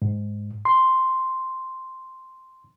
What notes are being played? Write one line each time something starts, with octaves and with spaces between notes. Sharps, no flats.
G#2
C6